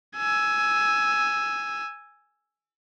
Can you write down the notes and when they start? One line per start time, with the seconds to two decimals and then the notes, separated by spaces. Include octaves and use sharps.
0.17 G#5 E6